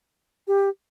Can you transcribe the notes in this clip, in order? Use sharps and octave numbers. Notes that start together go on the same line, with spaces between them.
G4